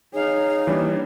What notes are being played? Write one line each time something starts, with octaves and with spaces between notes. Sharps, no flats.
D#4 G#4 C#5 F5
E3 G3 A#3 D4